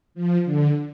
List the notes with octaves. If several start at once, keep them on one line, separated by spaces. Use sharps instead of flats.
F3
D3